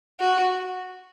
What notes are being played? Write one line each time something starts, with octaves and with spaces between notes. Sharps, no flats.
F#4